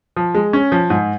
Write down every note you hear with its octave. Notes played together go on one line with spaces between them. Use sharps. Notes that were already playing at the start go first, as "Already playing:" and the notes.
F3
G#3
C#4
F3
G#2